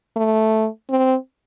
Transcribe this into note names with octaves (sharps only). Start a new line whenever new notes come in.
A3
C4